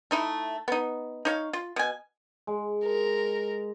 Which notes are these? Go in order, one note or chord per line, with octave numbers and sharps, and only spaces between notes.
A3 D#4 E4
B3 D#4
D#4 C#5 F5
F4
B2 G#5
G#3
A#4